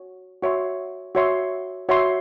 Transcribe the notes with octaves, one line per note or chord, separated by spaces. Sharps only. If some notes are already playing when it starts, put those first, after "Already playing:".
Already playing: F#4 C#5
F#4 C#5 E5 C6
F#4 C#5 E5 C6
F#4 C#5 E5 C6